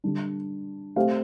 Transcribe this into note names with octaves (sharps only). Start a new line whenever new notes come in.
D3 G3 D4
A3 C4 G4 F5